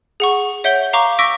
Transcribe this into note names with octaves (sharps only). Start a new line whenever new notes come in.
G#4 F#5 C#6
C#5 E5 F#5 G6 D7 G7
F5 A#5 C#6 D6
C#6 D6 E6 A#6 B6 D7